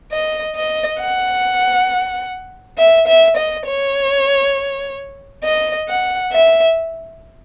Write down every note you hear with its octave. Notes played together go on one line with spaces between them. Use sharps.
D#5
D#5
F#5
E5
E5
D#5
C#5
D#5
F#5
E5